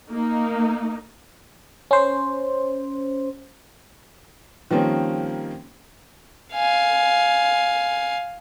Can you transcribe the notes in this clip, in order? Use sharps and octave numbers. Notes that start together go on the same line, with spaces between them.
A#3 D#4
C#4 C5
D#3 F3 G3 A#3 C4 C#4
F5 G#5